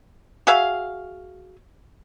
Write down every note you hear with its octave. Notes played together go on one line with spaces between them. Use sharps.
F#4 G#4 E5 F5